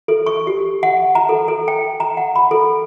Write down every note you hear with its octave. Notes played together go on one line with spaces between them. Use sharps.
A4
C#6
G4
F#5
A#5
A4
A4
G5
A#5
F#5
B5
A4